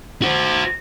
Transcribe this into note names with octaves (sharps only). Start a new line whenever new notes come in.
F#4 C5